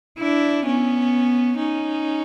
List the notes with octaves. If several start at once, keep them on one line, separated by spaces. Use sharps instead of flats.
D4 E4
B3 C#4
C#4 D#4